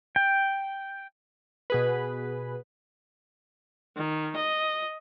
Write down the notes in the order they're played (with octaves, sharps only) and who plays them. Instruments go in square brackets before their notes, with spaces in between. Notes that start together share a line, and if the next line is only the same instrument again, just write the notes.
[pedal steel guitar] G5
[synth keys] B2 G#4 B4
[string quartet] D#3
D#5